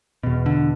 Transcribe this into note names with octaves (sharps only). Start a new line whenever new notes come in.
E2 B2
D3